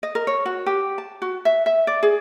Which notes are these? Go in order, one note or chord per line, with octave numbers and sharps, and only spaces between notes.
D#5
A#4
C#5
F#4
G4
A5
F#4
E5
E5
D5
G#4